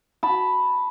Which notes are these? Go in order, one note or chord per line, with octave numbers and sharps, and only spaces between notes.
A5 B5